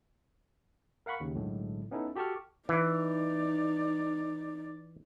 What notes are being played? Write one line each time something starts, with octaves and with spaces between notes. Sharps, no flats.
A#4 F5 F#5 B5 C#6
D#2 C#3
B1 A2 D3 G#3
B3 C#4 D#4 E4 A4
F#4 G4 A4 A5 C#6 F6
E3 D#4 D5